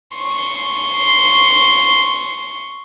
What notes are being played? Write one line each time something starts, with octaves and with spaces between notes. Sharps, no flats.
C6 C#6